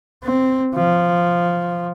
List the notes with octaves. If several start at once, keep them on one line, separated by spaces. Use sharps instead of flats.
C4
F3